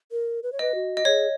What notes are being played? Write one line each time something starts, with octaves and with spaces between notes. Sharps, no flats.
A#4
B4
C#5
B4 D#5
F#4
D#5
G#4 C#5